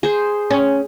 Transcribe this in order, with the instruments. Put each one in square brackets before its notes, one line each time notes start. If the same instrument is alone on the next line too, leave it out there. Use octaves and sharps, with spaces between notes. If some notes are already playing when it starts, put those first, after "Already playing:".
[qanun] G#4 C5
[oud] C#4